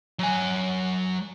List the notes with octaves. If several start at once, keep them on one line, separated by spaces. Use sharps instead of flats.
F#3 G#5